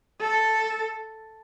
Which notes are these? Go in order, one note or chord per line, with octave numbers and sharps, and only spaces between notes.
A4